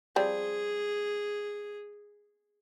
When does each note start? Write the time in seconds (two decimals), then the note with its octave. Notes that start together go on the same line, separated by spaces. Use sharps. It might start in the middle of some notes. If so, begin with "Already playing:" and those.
0.16 F3 G3 C4 G#4